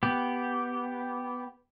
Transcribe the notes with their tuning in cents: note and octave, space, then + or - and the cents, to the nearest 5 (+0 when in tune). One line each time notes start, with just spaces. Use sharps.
B3 +0 G4 -5